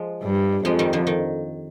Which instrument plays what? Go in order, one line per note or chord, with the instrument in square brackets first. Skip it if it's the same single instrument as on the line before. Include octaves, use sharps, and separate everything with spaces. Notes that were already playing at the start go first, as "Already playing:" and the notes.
Already playing: [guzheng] F3 G#3
[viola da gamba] G2
[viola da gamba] F2 [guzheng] F3 G#3
[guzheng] D#3 G3
D3 F3
D#3